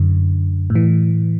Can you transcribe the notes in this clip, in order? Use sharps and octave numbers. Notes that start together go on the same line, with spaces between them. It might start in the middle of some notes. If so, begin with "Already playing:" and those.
Already playing: F#2 D3
A2
E3